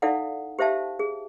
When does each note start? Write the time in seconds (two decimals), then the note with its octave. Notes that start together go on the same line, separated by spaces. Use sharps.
0.02 D#4 E4 A4 D5 F5 F#5
0.59 G4 C5 E5 F5 A5
0.99 G#4